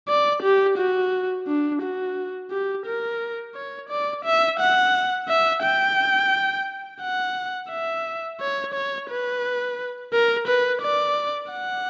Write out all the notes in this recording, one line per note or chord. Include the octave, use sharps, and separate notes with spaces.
D5
G4
F#4
D4
F#4
G4
A#4
C#5
D5
E5
F#5
E5
G5
F#5
E5
C#5
C#5
B4
A#4
B4
D5
F#5